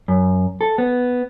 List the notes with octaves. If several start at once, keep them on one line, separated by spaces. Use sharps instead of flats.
F#2
A4
B3